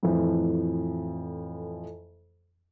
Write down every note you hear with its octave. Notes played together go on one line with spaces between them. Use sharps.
F2 A2 E3 F3